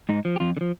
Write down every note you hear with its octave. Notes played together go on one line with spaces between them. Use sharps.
G#2 D#4
F3
G4
F2 F4
D3
F3